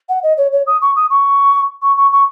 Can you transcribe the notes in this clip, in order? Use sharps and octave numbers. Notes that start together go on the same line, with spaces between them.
F#5
D#5
C#5
C#5
D#6
C#6
D#6
C#6
C#6
C#6
C#6